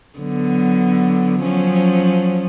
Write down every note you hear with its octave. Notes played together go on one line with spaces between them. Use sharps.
D3 F#3 B3
F3 F#3 C#4